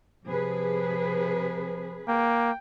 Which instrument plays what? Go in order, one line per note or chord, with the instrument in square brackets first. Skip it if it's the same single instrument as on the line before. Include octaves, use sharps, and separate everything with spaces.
[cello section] C3 G#4 B4 [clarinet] F3
[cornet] A#3 [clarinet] G5